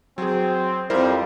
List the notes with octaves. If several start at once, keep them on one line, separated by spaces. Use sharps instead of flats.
F#3 C4 G#4
F2 G3 E4 A#4 C5